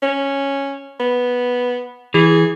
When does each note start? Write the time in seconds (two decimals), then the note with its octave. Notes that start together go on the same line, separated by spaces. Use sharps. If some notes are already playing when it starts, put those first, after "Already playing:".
0.02 C#4
1.00 B3
2.14 E3 G#4